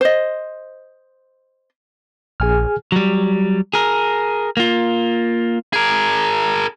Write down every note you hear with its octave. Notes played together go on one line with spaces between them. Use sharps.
C5 D#5
A#1 G#4 G#5 F6
F#3 G3
G#4 A#4
A#3 F4
G#4 A#4